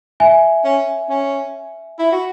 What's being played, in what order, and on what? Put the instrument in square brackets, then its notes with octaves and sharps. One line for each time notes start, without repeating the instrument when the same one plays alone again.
[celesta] E5 G#5
[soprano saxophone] C#4
C#4
E4
F#4